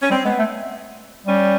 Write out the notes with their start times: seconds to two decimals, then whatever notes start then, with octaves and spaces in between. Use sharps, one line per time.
0.01 C#4
0.10 G3 C4
0.24 G#3 B3
0.39 A3
1.26 G3 C#4